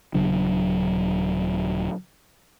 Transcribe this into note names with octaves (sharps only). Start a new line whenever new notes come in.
D#1 C#3 F#3 D4